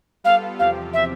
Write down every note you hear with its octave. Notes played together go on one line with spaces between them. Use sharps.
G3 B3 F4 A4 F5
E2 C3 F3 C4 G4 F5
E5